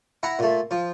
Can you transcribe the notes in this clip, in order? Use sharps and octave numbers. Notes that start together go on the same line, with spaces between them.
E4 F#5 A#5
A#2 A3
F3